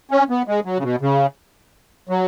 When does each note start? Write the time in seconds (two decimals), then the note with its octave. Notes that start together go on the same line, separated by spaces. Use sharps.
0.11 C#4
0.30 B3
0.48 G#3
0.65 F#3
0.79 C#3
0.83 B2
1.01 C#3
2.09 F#3